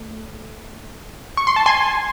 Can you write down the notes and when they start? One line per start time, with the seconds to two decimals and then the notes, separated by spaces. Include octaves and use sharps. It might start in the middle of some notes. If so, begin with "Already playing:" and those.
Already playing: A3
1.37 C#6
1.47 C6
1.56 A5
1.66 G#5 C6